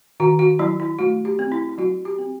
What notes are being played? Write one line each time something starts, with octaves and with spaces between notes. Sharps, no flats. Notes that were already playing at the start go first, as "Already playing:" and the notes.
D#3 F#4
F#4
F#3 E4
E4
A3 F#4
G4
C4
E4
E4
F#3 F#4
G4
C4